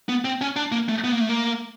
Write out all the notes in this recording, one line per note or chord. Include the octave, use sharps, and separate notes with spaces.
B3
C4
C#4
D4
A#3
A3
B3
A#3
A3
A#3